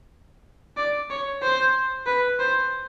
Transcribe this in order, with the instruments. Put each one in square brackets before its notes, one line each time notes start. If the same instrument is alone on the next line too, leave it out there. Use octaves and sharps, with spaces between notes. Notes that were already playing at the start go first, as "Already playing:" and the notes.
[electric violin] D5
C#5
C5
B4
C5